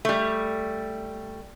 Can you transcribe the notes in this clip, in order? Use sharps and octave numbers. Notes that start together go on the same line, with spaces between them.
G3 A3